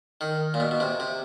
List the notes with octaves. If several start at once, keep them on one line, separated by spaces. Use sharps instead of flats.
D#3
A#2
B2
B2
C3
C3